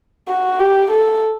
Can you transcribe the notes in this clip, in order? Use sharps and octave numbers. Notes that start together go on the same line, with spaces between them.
F#4
G4
A4